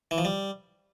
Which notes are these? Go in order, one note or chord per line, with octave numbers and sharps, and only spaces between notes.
E3
F3
G3